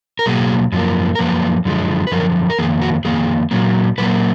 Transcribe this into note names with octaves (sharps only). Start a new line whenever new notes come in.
A#4
B2 F#3 A#3 G#4
F#2 F3 A#3
A#4
F#2 F3 A#3 B4
F#2 D3 F3 G#3
B4
F#2 D3 F3 A#4
A#4
F2 D#3 A#3 G#4
F#4
F2 D#3 A#3 G#4
A#2 F#3 A#3
A#2 F#3 A#3 B4